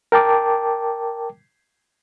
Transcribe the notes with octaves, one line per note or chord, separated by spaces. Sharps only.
A#4 G5 A5 D6